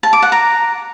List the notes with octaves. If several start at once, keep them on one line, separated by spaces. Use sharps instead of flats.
A5
D6
F#5
A#5